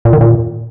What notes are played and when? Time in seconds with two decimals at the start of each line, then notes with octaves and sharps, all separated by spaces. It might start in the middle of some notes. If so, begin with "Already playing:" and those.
0.05 A#2
0.13 D#3
0.21 A#2